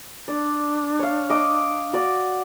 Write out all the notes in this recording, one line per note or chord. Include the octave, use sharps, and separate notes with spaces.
D4 D5
C#5 F5
D#5 D6
F#4 D5